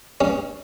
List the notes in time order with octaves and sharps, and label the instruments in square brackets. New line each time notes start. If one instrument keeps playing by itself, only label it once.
[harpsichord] G2 C#4